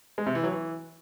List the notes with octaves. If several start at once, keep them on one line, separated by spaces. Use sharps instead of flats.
G#3
C3
E3
F#3
E3